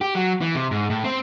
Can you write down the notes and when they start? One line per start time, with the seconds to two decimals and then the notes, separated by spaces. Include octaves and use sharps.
0.01 G4
0.15 F#3
0.41 E3
0.55 C3
0.71 G#2
0.90 A2
1.04 C4